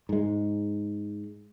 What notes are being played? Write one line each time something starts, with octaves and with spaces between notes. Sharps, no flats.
G#2 G#3